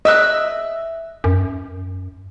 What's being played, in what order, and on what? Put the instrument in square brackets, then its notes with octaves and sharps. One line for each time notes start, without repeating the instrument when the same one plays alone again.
[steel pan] D#5 [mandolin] E5 E6 F#6
[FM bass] F#2